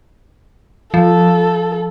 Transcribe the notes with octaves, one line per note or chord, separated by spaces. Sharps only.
F3 A4